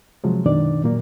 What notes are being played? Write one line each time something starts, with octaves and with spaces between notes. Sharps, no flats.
C3 F3 F#3 G#3
F#2 B2 D#3 D4 D5
A#2 F#3 A#3